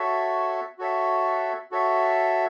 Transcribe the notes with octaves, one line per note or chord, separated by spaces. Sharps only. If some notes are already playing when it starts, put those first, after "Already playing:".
Already playing: F#4 A4 C#5 E5
F#4 A4 C#5 E5
F#4 A4 C#5 E5